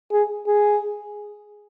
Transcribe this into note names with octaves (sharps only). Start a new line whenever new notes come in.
G#4
G#4